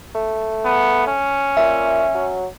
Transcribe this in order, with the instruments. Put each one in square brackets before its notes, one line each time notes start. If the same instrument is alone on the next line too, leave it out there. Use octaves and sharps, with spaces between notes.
[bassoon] A3
[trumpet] B3
C#4
[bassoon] A#2 [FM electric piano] E5
[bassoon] F#3